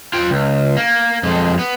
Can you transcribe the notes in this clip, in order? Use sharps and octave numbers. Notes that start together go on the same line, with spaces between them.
F4 G5
C#2
A#3
F2 G#3
B3